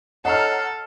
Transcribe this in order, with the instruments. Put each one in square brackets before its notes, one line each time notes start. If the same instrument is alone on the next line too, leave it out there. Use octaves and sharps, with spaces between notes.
[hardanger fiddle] A4 [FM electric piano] C#5 D#5 C7 [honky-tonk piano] F#5 A#5 F6